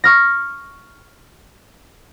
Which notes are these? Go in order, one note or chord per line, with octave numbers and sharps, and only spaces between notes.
C#6 F6 A#6